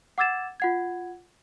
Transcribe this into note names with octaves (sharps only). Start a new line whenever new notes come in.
F#5 D6 E6 G#6 A6 E7
F4 F#5 G#6